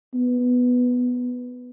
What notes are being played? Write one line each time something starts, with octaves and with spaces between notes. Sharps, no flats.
B3